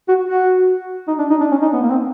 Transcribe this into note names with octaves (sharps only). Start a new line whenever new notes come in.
F#4
F#4
D#4
D4
D#4
D4
C#4
D#4
B3
A#3
C4